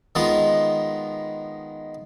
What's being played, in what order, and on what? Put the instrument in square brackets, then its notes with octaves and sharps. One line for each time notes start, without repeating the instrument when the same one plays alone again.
[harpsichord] D#3 G#3 B3 F4